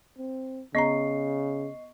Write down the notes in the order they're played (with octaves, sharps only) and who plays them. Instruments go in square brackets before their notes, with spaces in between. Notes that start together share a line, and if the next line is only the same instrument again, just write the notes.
[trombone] C4
[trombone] C#3 [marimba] B3 A#5 [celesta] D#5 C#6 C7